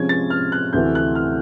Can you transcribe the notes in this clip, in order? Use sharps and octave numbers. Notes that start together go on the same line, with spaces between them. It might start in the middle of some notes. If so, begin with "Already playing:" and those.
Already playing: C3 F3 G#3 C#4 G#6
A6
F6
F#6
D2 C3 E3 A3 G6
F#6
F6